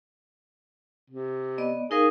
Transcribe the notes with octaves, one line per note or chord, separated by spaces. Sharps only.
C3
B3 D5 D#5
D#4 G#4 A#4 F5